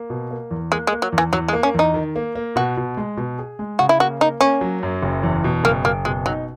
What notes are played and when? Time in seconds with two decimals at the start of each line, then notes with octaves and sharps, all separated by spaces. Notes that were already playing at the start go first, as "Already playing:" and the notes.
Already playing: A#3
0.10 B2
0.31 A#3
0.51 E2
0.72 G#3 A#3
0.87 G#3
0.93 A#3
1.02 F#3
1.12 E2
1.18 E3
1.33 E2 F#3
1.48 G#3
1.53 A#3
1.63 C#4
1.74 E2 D#4
1.94 D#3
2.16 A#3
2.35 A#3
2.56 B2 F#4
2.77 B2
2.97 G#3
3.17 B2
3.39 G#4
3.59 G#3
3.79 C#3 F#4
3.89 E4
4.00 A#3 F#4
4.20 A#3 D#4
4.41 A#3 C#4
4.61 F#3
4.83 F#2
5.03 F#1
5.23 E2
5.44 B2
5.64 F#1 A#3
5.85 F#1 A#3
6.05 B2 G#3
6.26 F#3 D#4